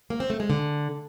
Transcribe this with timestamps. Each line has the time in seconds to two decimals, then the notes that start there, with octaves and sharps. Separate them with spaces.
0.10 A#3
0.20 C4
0.30 A3
0.40 G#3
0.50 D3